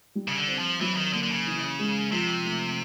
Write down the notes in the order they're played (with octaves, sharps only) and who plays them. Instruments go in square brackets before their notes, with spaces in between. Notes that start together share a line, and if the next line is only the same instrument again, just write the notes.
[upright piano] G3
[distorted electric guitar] C#3
D3
[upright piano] C4
[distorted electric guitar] F3
[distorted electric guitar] E3 [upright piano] F#3
[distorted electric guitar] D#3
[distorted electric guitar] D3 [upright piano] A#3
[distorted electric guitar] D3
C#3
[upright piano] E3
G#3
[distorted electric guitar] C3 [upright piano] F3
[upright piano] A3